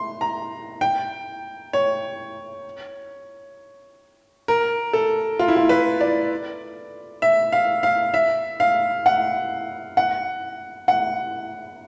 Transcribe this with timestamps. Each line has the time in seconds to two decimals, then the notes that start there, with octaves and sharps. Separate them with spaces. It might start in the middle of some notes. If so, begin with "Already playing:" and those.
Already playing: C6
0.21 A#5
0.81 G5
1.73 C#5
4.48 A#4
4.93 A4
5.39 F4
5.48 E4
5.56 F4
5.69 B4
6.01 D5
7.22 E5
7.52 F5
7.83 F5
8.14 E5
8.60 F5
9.06 F#5
9.97 F#5
10.88 F#5